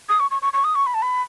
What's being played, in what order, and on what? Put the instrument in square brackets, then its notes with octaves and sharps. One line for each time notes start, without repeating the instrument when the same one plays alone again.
[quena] D#6
C#6
C#6
C#6
C#6
D#6
C#6
B5
A5
B5